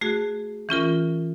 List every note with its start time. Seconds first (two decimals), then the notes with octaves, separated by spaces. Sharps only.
0.01 A3 F#4 G#4 F#6
0.69 E3 C#4 F4 A#4